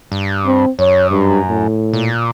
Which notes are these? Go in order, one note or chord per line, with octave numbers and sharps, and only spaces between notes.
G2
C4
F#2 C#5
G2
A2
A#2